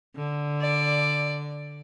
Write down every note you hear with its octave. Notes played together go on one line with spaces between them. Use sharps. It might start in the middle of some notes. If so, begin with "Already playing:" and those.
D3
D5